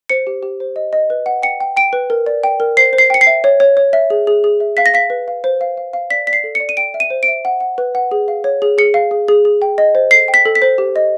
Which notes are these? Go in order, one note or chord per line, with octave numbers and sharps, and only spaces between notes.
C5 C#7
G4
G4
C5
D#5
D#5
B4
F#5
G5 C#7
G5
G5 D7
B4
A#4
D5
G5
A#4
C5 C7
C5
C7
G5 C#7
C7
E5
C#5
C#5
C#5
E5
G#4
G#4
G#4
E5
F5 B6
A#6
F5 B6
B4
F5
C5
F5
F5
F5
D5 B6
D5 B6
C7
A4
C#7
D5
D#7
G5 D7
E5
D#7
C5
D7
E5
F#5
F#5
B4
F#5
G#4
F5
C#5
G#4
G#4 C#7
F5
G#4
G#4
G#4
G5
D#5
C5
A4 C7
G5
B6
A4
B6
C5
G4
D#5